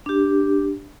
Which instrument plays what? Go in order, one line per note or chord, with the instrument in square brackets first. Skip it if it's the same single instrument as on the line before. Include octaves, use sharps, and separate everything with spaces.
[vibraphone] D4 G4